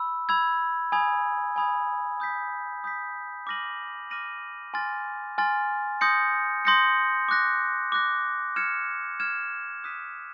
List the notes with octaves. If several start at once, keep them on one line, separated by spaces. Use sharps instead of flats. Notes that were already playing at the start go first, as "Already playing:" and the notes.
Already playing: B5 E6
B5 E6 G#6
G#5 B5 D#6 G#6
G#5 B5 D#6 G#6
D#6 G6 B6
D#6 G6 B6
D6 F6 A#6 D#7 F#7
D6 F6 A#6 D#7 F#7
G#5 C6 F6 A6
G#5 C6 F6 A6
C6 D#6 G6 A#6 C#7
C6 D#6 G6 A#6 C#7
D6 F#6 A#6
D6 F#6 A#6
F6 G#6 C#7 E7
F6 G#6 C#7 E7
D#6 F#6 B6 D#7